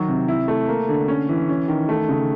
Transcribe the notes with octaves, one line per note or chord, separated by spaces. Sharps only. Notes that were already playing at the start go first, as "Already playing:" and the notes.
Already playing: D#3 F#3
C3
E4
A3
A#3
D3
C#4
E3
C#4
D#3
A3
C#3